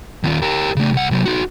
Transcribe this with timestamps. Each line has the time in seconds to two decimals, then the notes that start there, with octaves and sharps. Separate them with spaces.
0.24 D#2 F4
0.42 G4 A#4
0.76 C#3 A3
0.93 C2 F#5
1.11 C3 F#3
1.25 D#4 F#4